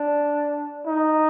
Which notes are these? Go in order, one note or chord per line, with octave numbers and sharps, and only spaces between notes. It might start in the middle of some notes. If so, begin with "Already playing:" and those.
Already playing: D4
D#4